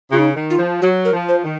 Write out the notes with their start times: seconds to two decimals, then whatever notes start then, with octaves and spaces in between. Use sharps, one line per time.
0.11 C#3 F4
0.19 D#4
0.35 D#3
0.50 F4
0.58 F3
0.81 F#3 F#4
1.05 A#4
1.13 F3
1.29 C5
1.44 D#3